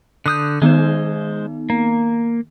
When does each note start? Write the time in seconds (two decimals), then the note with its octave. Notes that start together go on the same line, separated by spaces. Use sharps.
0.26 D3 D#6 F#6 G6
0.62 D#3 G#3 B3 D#4 C5
1.70 A#3